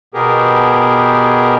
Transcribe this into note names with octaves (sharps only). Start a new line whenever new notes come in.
B2 B3 G4 G#4 A#4